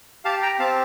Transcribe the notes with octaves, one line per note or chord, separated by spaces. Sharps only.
G4 F5 A5
G5 A#5
C4 F5 A5